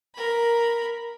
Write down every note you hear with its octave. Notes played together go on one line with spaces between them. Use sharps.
A#4 B5